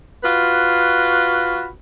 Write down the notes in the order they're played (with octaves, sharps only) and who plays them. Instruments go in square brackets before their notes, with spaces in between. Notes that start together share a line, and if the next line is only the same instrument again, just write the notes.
[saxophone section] F4 F#4 B4